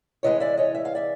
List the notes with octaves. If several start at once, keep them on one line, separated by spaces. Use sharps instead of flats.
C3 E3 G#3 C#5 D#5
D5 E5
C#5 D#5
E5
F5
D5 E5